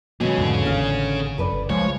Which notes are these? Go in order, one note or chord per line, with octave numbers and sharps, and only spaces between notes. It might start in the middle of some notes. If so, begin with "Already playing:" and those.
B2 D#3 F#3 G#3 A3 C#4 G#4
E2 G#2 D3 D#3
A1 C#3 F5
F#1 F#2 A4 B4 D5
G1
C#2 F3 G#3 C#5